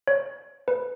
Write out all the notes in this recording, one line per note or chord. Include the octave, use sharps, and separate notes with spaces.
C#5
B4